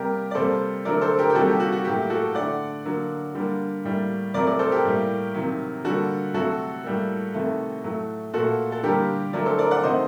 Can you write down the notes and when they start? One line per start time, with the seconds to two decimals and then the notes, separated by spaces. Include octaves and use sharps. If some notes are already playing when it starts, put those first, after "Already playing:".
Already playing: C3 G3 A#3 G4 A#4
0.31 D5
0.35 C3 G3 A#3 A4 C5
0.85 D3 F#3 A3 A#4 D5
1.01 A4 C5
1.19 G4 A#4
1.30 G4
1.35 C3 D#3 G3 A#3 F#4 A4
1.48 G4
1.60 F#4
1.72 F#4
1.85 A2 F#3 A#3 G4
2.10 F#4 A4
2.35 D3 A3 D5 F#5
2.85 D3 F#3 A#3
3.35 D3 G3 A#3
3.84 A2 G3 A#3
4.34 C3 F#3 A3 A#4 D5
4.47 A#4 D5
4.59 A4 C5
4.72 G4 A#4
4.85 A2 G3 A#3
5.34 C3 D#3 F#3
5.84 D3 G3 A#3 F#4 A4
6.34 C3 F#3 A3 F#4 A4
6.84 A2 G3 A#3
7.34 C3 D#3 A3
7.84 A2 F#3 A3
8.34 A#2 A3 F#4 A4
8.72 A4
8.83 D3 G3 A#3 G4 A#4
9.33 D3 F#3 A3 A#4 D5
9.46 A4 C5
9.58 A#4 D5
9.71 D5 F#5
9.83 C3 D#3 A3 C5 D#5